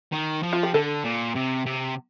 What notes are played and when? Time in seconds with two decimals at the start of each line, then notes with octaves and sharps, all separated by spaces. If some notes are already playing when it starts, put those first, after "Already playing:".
0.12 D#3
0.43 F3
0.53 F4
0.63 G4
0.74 D3 A4
1.05 A#2
1.35 C3
1.66 C3